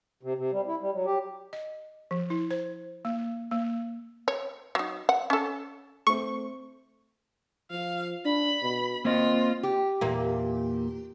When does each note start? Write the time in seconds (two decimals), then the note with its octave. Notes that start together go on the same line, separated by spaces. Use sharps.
0.23 C3
0.38 C3
0.52 G3
0.67 E4
0.81 G3
0.94 F#3
1.06 G4
1.53 D#5
2.11 F3
2.30 E4
2.51 C5
3.05 A#3
3.51 A#3
4.28 C#5
4.75 F#3 D#4
5.09 F#5
5.30 C#4 A4
6.07 A3 C4 C#6
7.71 F3 F5
8.25 D4 B5
8.62 B2
9.05 A#3 C4 F4 D#5
9.63 G4
10.01 E2 A#2 A#3